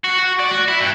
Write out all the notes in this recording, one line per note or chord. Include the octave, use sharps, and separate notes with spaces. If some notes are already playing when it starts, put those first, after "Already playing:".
F#4
F#4
D5
F#4
E4
G2